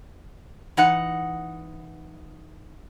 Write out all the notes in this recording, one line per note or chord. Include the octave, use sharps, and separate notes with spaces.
E3 D#4 F#5